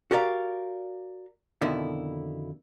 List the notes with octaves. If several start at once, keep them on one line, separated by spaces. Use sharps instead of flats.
F#4 G4 A#4 D5 F5
F2 B2 D3 D#3 E4